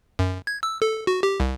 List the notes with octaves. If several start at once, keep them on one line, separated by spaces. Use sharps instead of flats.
F#2
G#6
E6
A4
F#4
G4
C2